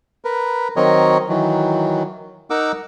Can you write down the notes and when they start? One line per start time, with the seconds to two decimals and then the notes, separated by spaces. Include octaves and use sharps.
0.25 A#4 B4
0.76 D#3 F#3 C4 A#4 C#5 D#5
1.29 D#3 E3 F#3
2.50 D#4 A#4 F#5 D6 E6